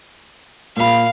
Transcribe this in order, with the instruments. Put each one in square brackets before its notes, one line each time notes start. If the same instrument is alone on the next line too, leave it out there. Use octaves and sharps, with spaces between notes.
[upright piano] A#2 B5 [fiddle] F5